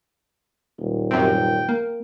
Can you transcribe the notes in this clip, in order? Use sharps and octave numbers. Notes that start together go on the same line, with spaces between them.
D#1
F#2 C3 G5
A#3